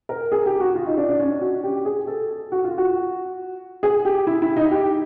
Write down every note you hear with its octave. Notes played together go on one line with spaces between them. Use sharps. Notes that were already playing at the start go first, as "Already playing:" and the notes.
A#4
G#4
G4
F#4
F4
D#4
D4
D4
C#4
F#4
G4
G#4
A4
F#4
F4
F#4
G#4
G4
E4
E4
D#4
G4